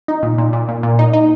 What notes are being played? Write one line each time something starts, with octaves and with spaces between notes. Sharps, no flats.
D#4
A#2
A#2
A#2
A#2
A#2
D#4
D#4